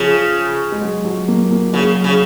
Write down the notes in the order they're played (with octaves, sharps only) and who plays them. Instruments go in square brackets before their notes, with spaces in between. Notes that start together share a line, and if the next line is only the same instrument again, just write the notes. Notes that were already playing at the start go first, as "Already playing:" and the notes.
Already playing: [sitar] C#3 [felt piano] F3
[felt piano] G#3
F#3
F#3
A#3
A#3
[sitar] C#3 [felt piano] F#3
[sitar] C#3